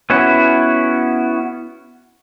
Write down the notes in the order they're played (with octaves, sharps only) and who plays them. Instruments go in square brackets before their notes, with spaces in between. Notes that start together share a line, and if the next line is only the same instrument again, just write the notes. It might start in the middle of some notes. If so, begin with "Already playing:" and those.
[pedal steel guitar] B3 C#4 E4 F#4